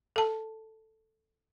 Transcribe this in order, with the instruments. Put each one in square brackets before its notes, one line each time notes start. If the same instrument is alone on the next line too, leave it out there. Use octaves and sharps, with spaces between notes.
[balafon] A4 A5